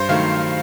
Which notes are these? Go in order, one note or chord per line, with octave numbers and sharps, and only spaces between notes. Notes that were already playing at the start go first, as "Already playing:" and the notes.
Already playing: G2 C5
D#3 F#3 A3 F5